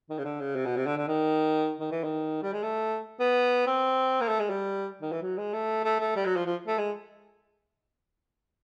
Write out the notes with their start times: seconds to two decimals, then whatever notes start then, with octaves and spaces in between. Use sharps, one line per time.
0.10 D#3
0.18 C#3
0.25 D3
0.40 C#3
0.55 C3
0.66 B2
0.77 C3
0.86 D3
0.97 D3
1.08 D#3
1.80 D#3
1.92 E3
2.04 D#3
2.42 G3
2.53 G#3
2.63 A3
3.20 B3
3.67 C4
4.21 A#3
4.28 A3
4.39 G#3
4.50 G3
5.02 D#3
5.12 E3
5.22 F#3
5.38 G#3
5.54 A3
5.84 A3
6.00 A3
6.16 G3
6.26 F#3
6.36 F3
6.46 F3
6.67 A3
6.78 G#3